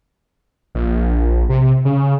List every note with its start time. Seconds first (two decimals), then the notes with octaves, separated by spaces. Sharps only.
0.75 A#1
1.49 C3
1.85 C#3